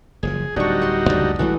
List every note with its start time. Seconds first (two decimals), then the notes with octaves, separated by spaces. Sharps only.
0.23 F#1 D#3 F3 G#4
0.56 D1 G3 D4 D#4 F#4 C#6
0.82 F#5 C6
1.09 C#2 F#2 C#3 D4
1.39 G#1 E3 G3 A3 F#4 D#5